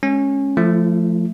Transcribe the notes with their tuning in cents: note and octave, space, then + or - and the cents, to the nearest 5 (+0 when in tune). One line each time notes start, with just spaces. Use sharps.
G#3 +20 C#4 -10
F3 +0 A3 +0 E4 +45